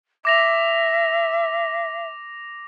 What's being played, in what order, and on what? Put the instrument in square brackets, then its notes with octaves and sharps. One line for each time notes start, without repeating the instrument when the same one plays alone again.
[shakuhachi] E5 [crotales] D6 A#6 F7